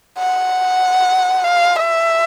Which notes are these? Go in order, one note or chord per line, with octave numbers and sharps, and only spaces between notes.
F#5
F5
E5